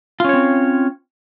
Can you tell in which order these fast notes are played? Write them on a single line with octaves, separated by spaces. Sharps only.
F4 C#4 C#5 C4